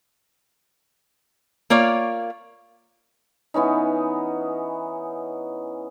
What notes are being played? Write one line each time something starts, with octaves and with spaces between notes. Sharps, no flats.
A#3 F4 C#5 D5
E3 B3 C#4 D#4